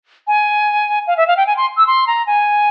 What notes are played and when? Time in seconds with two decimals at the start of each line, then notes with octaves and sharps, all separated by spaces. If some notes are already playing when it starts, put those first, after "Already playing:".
0.27 G#5
1.07 F5
1.17 E5
1.27 F5
1.37 G5
1.47 G#5
1.57 C6
1.77 E6
1.87 C6
2.07 A#5
2.27 G#5